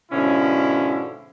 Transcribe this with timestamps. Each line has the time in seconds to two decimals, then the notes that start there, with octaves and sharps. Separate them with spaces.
0.12 G#2 B2 D3 F3 C#4 E4